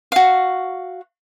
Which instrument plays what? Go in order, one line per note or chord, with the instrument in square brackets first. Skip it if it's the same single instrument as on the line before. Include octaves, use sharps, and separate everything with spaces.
[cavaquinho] F#4 F5